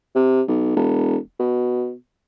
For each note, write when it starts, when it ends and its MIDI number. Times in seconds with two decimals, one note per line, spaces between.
0.15 0.42 48
0.47 0.71 35
0.76 1.17 28
1.39 1.93 47